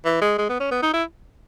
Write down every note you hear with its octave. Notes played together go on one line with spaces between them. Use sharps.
E3
G#3
G#3
B3
C#4
B3
D#4
E4